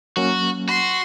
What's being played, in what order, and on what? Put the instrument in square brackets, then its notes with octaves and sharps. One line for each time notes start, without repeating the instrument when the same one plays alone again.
[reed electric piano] F#3 A#3 C#4 [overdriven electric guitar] F#4
[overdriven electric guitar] F#4 [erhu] C6